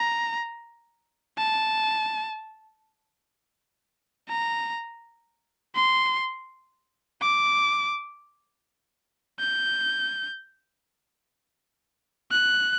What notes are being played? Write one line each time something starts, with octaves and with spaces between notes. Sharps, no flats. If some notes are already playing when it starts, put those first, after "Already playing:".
Already playing: A#5
A5
A#5
C6
D6
G6
F#6